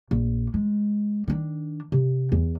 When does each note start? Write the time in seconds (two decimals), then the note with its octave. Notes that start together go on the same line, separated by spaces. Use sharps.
0.11 A#1
0.54 G#3
1.28 D#3 D4
1.92 C3
2.32 E2